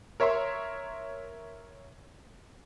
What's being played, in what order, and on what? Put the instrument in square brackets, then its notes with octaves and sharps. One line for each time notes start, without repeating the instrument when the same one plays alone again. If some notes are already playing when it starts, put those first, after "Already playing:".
[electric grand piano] A#4 C#5 E5 A#5 C6